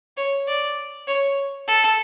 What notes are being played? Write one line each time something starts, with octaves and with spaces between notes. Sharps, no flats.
C#5
D5
C#5
A4